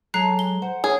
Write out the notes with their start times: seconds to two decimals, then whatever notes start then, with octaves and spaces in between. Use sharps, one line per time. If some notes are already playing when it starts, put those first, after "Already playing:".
0.14 F#3 G#3 G#4 A4 A#5 F#6 C7
0.39 G7
0.62 C5 F#5
0.84 A#3 G#4 C#5